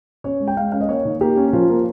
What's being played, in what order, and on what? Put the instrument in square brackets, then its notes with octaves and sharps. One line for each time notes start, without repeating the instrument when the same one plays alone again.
[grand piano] C#4 C#5
G#3
G5
G#3 F5
C#4 F5
D#5
A#3 C#5
D#3
A#3 G4
C#4
F3 F4
A#3